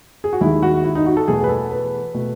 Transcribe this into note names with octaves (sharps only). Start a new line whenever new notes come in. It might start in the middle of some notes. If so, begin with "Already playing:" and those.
G#4
F#4
D#2 D#3 G#3 E4
F#4
E4
D#4
F#4
A4
E2 B2 A3 G#4
B4
A4
B4
B2 A3